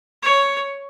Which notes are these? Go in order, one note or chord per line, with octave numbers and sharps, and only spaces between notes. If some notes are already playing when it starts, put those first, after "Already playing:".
C#5